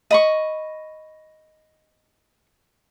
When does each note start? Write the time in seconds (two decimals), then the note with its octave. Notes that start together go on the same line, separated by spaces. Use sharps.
0.11 D#5 B5 C#6